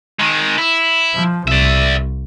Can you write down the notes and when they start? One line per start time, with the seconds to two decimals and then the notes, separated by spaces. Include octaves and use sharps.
0.19 D#3 G#3
0.58 E4
1.15 F3
1.48 C2 D5 E5